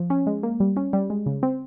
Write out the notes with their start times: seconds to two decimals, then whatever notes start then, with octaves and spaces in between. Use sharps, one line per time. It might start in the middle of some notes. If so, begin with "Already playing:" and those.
Already playing: F3
0.10 C#4
0.27 G#3
0.43 A#3
0.60 G3
0.77 C#4
0.93 G3
1.10 G#3
1.26 C#3
1.43 C4